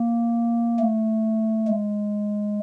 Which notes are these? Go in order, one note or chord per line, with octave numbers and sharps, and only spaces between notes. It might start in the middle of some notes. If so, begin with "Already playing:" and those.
Already playing: A#3
A3
G#3